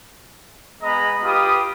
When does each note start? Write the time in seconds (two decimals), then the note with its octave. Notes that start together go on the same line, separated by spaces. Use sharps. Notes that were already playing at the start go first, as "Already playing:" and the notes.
0.82 G#3 B3 D#5 A#5 B5
1.24 F4 G4 B4 D#6